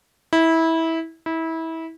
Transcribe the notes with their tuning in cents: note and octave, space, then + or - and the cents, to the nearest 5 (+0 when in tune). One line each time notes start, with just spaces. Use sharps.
E4 -20
E4 -25